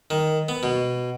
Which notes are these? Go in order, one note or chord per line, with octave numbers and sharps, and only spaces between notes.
D#3
B3
B2